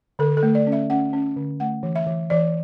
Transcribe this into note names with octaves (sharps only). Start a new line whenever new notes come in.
D3 A4
A4
A3
D5
C#4
E5
C#4 F#5
C#4
D3
A3 F#5
E3
E5
E3
E3 D5